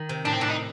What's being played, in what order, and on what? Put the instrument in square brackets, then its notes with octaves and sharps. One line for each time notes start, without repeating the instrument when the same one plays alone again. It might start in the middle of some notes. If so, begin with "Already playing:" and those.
Already playing: [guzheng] D#3
C3
[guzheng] A2 [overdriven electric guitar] D4
[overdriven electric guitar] C4
[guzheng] A2 [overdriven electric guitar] D4
[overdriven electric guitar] D#4